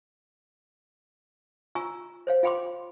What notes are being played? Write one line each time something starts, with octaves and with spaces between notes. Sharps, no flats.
F4 G#5 A#5 C#6 E6
C5 C#5 F5
F4 F5 G5 B5 C6 D6